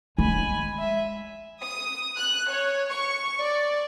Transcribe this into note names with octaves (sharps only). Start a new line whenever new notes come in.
G#3 G#5 B5
E5
D#6
F#6
C#5
C#6
D5